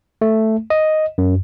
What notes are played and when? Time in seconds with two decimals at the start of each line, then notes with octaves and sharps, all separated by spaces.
0.22 A3
0.70 D#5
1.18 F#2